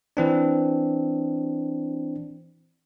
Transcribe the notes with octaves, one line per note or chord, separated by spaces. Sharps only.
E3 C4 D4